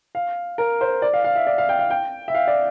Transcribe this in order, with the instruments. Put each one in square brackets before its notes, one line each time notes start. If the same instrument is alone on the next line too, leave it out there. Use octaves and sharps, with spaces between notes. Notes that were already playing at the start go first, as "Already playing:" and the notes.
[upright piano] F5
A#4
C5
D5
F5
F5
E5
D5
F5
G5
F5
G5
E5
F5
D5